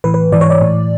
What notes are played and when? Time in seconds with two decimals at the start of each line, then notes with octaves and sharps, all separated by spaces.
0.04 A2 E3 B4
0.14 B4
0.32 G#2 E3 D5
0.41 C#5
0.50 D5
0.61 A2 E3